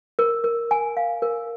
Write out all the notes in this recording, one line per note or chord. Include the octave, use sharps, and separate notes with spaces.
A#4
A#4
G#5
F5
A#4